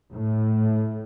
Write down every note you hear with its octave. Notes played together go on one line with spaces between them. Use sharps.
A2